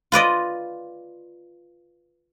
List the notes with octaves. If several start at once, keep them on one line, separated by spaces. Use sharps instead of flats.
F4 B4 D5 D#5